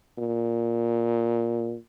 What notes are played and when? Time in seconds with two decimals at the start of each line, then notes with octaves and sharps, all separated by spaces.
0.18 A#2